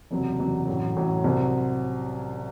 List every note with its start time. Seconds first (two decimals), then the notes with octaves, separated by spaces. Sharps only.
0.11 F#1 E2 C3 F#3
0.39 F#1 E2 C3 F#3
0.67 A1 A2 F#3
0.96 A1 A2 F#3
1.24 C2 C3 F#3 C4